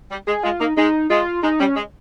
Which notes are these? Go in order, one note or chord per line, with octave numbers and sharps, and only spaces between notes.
G3
G#3 G#4
G#3 F4
A#3 D#4
G#3 D#4
G#3 F4
G#3 D#4
G3 C#4
G#3